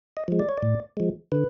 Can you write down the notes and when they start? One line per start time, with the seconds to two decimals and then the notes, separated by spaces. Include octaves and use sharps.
0.17 D#5
0.28 F3 G#3
0.39 D5
0.49 C#5
0.58 D5
0.63 A2
0.97 F3 G#3
1.32 D3 B4